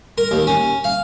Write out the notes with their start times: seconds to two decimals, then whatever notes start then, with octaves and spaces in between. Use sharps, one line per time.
0.18 A#4
0.31 D#2
0.47 C#4
0.84 F5